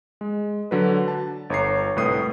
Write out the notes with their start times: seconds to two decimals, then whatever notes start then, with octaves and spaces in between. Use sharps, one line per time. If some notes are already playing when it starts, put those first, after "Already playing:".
0.21 G#3
0.71 D3 F#3 B4
1.08 A5
1.50 G1 C#5 A#5 C7
1.96 C2 A2 B4 D#6 C7